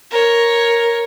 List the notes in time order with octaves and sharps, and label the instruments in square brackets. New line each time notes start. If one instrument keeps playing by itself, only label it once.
[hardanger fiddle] A#4 C#5